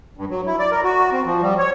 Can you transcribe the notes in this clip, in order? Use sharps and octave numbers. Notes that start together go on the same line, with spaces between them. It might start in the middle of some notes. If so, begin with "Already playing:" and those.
G2
F#3
E4
D5
A#4
F#4
C4
F3
G3
C#5